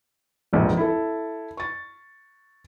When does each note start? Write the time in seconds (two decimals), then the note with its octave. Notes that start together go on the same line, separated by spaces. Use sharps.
0.53 F1 A#1 G#2
0.77 E4 A4
1.57 C#6 A6